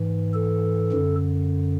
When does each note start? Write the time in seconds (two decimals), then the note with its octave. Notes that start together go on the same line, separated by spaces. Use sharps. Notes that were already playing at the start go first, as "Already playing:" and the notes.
Already playing: G#2 E3
0.34 A4
0.92 F#2 D3